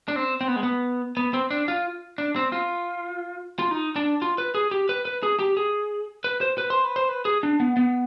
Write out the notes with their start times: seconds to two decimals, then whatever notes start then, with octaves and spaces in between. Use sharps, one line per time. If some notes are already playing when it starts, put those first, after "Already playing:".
0.08 D4
0.16 C4
0.41 C4
0.48 B3
0.56 G#3
0.63 B3
1.17 B3
1.34 C4
1.51 D4
1.68 F4
2.18 D4
2.36 C4
2.52 F4
3.59 F4
3.71 D#4
3.96 D4
4.22 F4
4.38 B4
4.55 G#4
4.71 G4
4.89 B4
5.05 B4
5.23 G#4
5.39 G4
5.57 G#4
6.24 B4
6.41 C5
6.58 B4
6.70 C5
6.84 B4
6.96 C5
7.09 B4
7.25 G#4
7.43 D4
7.60 B3
7.77 B3